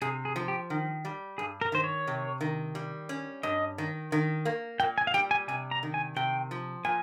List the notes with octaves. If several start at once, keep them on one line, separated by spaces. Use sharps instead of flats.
C3 G#4
G#4
F3
G4
D#3
G3
G2 G#4
A#4
D#3 C5
C#5
C3
D#3
G3
C#4
G2 D#5
D#3
D#3
A#3
A#2 G5
G#5
F5
G3 G5
G#5
C3 G#5
A#5
D#3
G#5
C3 G5
F3
A#2 G#5